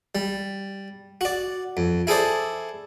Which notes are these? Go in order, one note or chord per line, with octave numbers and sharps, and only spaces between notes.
G3
F#4 D5
F2
E4 G#4 A4 C5 D5